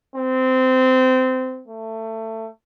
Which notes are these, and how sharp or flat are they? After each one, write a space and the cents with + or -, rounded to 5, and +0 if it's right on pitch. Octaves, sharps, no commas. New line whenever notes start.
C4 -20
A3 +20